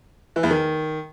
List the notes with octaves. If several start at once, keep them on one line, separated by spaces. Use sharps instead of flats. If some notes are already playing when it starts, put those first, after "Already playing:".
E3
E2
D#3